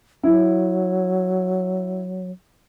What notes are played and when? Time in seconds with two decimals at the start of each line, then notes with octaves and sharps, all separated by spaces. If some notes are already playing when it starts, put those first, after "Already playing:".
0.23 F#3 E4